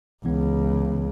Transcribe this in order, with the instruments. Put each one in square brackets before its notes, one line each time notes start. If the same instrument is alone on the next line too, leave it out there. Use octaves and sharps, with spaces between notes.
[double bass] C#2 C#3 [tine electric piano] E3 B3